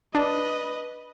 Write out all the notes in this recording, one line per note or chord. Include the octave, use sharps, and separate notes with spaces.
D4 B4 D#5